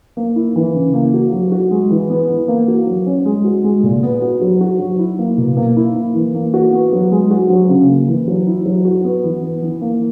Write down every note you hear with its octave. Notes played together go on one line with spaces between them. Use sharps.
A#3
E4
E3
C#3
A#3
F#4
F#3
F#4
G#3
E3
B3
E3
A#3
F#4
F#3
C#4
G#3
F#4
G#3
A#2
B3
F#4
F#3
F#4
F#3
E4
A#3
B2
A#3
E4
A#3
E3
A#3
F#4
B3
F#3
G#3
F#4
F#3
C#3
A#3
E3
F#3
E4
F#3
F#4
B3
E3
B3
E3
A#3